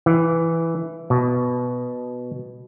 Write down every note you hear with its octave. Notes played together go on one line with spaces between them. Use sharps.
E3
B2